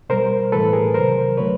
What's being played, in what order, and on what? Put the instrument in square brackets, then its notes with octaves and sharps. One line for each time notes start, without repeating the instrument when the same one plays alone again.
[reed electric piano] B2 G3 A#4 C5
A2 E3 A3 A4 B4
G#4 A#4
C3 D#3 F#3 A#4 C5
D3 F#3 A3 B4 C#5